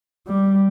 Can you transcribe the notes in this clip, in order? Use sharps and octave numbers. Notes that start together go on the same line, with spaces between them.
G3